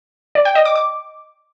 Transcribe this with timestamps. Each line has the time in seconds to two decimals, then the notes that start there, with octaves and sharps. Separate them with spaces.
0.35 D5
0.45 G5
0.55 D#5
0.65 D6
0.76 D6